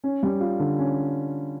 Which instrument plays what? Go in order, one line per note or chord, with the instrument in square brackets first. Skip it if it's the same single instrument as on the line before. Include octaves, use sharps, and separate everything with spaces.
[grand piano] C#4
G3
F4
D3
C#4